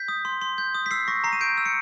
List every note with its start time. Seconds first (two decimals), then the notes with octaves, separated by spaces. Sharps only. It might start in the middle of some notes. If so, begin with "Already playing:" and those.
Already playing: G6 B6
0.08 D#6
0.25 C6
0.41 C6
0.58 G6
0.75 D#6
0.86 B6
0.91 E6 C7
1.08 C#6 A#6
1.24 A#5 C7
1.33 D#7
1.41 G6 D7
1.57 E6
1.66 C#7